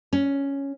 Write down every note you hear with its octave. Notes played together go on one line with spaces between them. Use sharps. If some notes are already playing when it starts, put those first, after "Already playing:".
C#4